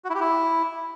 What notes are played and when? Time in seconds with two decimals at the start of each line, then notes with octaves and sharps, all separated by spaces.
0.05 F#4
0.10 E4
0.15 G4
0.20 E4